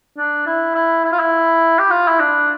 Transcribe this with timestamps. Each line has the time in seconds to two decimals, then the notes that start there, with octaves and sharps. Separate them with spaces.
0.17 D4
0.46 E4
0.75 E4
1.04 E4
1.12 F4
1.19 E4
1.79 G4
1.91 F4
2.08 E4
2.20 D4